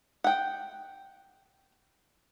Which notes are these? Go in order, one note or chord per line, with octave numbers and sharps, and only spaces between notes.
F#5 G5